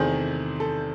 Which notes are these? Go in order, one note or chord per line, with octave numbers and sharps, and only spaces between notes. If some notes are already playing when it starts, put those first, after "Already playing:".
Already playing: E2 C3 D#3 A3 G#4 C5
A4